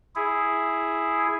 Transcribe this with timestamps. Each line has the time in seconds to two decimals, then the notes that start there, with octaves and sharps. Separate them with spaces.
0.16 E4 G#4